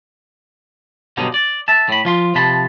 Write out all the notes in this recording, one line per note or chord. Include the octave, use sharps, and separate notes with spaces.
G2 B2 D3 F#3 D#4
D5
E5 A5
A2 B5
F3 F4 C6
C3 F3 A5 B5 C6